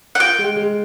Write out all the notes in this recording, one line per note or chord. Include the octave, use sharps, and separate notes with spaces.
F#5
F4 G5
G#3
G#3